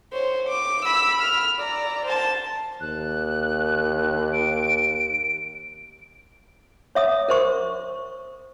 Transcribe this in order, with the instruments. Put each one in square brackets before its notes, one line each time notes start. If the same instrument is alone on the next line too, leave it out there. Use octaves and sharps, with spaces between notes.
[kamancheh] C5 C#5
D6
B5 E6
F6
D5 A#5
C5 A5
[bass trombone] D#2 [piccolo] F#6
[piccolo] D7
[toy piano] C#5 E5 D#6
A#4 C5 C#6